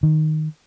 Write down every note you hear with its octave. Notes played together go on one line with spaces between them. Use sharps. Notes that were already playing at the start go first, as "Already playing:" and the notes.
D#3